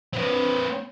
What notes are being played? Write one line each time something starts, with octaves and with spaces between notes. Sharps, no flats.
C4 B4